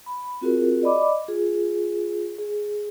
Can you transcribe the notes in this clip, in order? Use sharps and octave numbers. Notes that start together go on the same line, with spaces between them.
B5
C4 F4 F#4 G#4 A#4
D5 D#5 B5 D6
F4 G#4
G#4